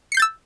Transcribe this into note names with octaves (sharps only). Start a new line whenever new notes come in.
E6 G6 A6 C7 C#7